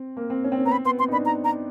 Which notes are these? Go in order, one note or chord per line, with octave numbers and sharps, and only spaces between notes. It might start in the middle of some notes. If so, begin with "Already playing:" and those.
Already playing: C4
A#3
C4
C#4
C4
C#4
B3 A#5
C4 B5
B3 C6
C4 C6
D#4
D4 B5
A#5
A#5